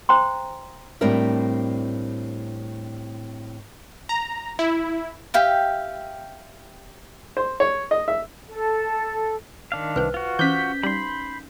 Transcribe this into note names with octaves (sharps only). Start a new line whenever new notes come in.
C5 G5 A#5 C6
A2 G3 C4 D4 A#4 E5
A#5
E4
G4 E5 F5 G5
C5
C#5
D#5
E5
A4
D#3 D4 F5
C2 B4 C5 G5
F4 F#4
E3 C#4 C5 D6 G6 B6
G3 D#4 F5 B5 C6